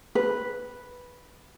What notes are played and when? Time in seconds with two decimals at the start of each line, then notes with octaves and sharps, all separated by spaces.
0.15 B4